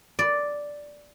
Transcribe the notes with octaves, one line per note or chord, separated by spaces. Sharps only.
D5